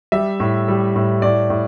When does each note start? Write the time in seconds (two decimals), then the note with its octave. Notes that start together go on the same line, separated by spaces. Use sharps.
0.12 G3 E5
0.40 A2
0.68 G3
0.96 A2
1.22 A2 D5
1.50 A2